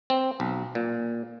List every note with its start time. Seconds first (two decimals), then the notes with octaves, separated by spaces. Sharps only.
0.10 C4
0.40 B1
0.75 A#2